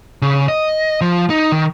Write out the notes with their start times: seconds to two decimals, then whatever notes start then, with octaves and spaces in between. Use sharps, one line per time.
0.22 C#3
0.48 D#5
1.01 F3
1.30 D#4
1.52 D#3